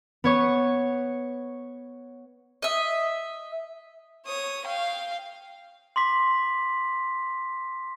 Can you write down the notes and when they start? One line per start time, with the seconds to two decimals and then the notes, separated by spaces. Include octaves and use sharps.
0.24 B3 C#5 C#6
2.62 D#5 E5
4.26 C#5 D#6
4.65 F5 G5
5.96 C6 D6 B6